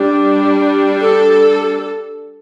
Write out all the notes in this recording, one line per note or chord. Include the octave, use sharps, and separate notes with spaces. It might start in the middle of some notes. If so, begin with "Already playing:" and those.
Already playing: G3 D4
A4